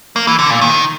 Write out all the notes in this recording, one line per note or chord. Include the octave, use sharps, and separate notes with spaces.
A#3
E3
D3
A#2
D#3